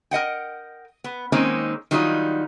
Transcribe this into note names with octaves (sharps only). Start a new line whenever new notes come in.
A#4 D#5 F#5 G5
B3
D#3 G#3 A#3 C4 C#4 D#4
D#3 F#3 G3 D4 D#4 F4